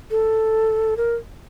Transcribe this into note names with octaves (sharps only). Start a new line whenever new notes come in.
A4
A#4